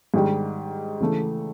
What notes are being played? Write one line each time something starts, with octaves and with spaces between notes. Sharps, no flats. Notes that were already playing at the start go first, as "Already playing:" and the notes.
G#2 D#3 G3
C#3 E3 A3